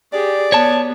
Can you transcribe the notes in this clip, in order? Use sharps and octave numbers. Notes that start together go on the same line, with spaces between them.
G4 G#4 D5
B3 C#5 A5